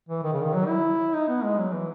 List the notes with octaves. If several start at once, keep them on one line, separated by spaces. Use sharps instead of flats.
E3
D#3
C#3
D#3
F#3
E4
D#4
B3
G#3
F#3
E3